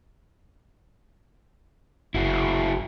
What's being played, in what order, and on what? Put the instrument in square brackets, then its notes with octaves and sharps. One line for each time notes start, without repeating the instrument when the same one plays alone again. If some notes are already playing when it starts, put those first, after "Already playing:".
[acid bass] F#1 [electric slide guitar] E4 F#4 G#4